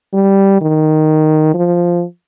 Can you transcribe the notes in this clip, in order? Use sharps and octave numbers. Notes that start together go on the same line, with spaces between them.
G3
D#3
F3